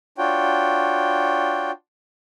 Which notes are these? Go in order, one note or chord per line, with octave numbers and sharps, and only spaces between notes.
D4 F4 F#4 C#5 G5